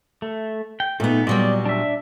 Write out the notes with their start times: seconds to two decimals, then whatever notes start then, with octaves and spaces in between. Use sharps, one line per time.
0.22 A3
0.80 G5
1.00 A#2 A3 B3 D#4
1.27 A#2 F#3 G3 D5 D#5
1.66 D4 E5